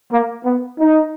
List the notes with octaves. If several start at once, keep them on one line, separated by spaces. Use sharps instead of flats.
A#3
B3
D#4